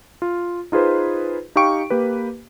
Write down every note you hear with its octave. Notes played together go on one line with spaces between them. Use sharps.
F4
D#4 F4 G#4 B4 C5
D#4 G4 F5 G5 C#6 D7
A#3 G4 B4